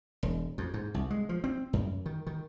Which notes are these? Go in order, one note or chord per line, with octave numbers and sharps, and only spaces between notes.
E1
F2
G#2
C2
G#3
F3
C4
F#2
D#3
D#3